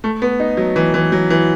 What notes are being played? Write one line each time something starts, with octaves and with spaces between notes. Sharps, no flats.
A3
B3
D#4
F#3
E3
E3
F#3
E3